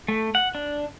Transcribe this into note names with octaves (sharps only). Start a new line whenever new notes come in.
A3
F#5
D4